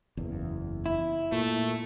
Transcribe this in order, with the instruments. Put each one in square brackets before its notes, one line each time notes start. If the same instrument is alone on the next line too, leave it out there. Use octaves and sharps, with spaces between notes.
[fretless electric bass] F#1 E2
[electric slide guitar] E4
[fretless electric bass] A#2 [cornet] A3